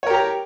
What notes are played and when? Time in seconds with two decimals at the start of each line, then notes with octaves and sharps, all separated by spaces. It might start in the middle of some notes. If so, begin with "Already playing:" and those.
0.03 C#5
0.07 A#4
0.10 G4
0.14 A#5